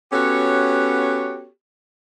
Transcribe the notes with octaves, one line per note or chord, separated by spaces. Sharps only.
B3 C#4 F#4 G4 A4 C#5